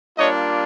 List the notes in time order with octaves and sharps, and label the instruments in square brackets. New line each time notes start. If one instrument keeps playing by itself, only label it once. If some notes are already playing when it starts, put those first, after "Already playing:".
[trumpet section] G3 A#3 D4 F4 C#5 D#5